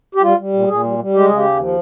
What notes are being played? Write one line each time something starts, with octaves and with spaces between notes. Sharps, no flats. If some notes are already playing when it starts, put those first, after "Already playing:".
G4
G3 F4
G3
A#2
A#2 G#4
G3
G3
G#3 G4
C#3 G#4
G4
D#2
F3